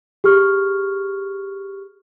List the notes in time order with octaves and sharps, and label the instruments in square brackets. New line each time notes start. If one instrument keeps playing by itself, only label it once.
[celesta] G4 G#4 C#6 F6